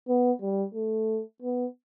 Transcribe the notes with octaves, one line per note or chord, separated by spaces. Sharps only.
B3
G3
A3
B3